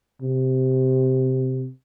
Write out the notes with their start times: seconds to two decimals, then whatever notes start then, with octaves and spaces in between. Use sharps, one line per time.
0.22 C3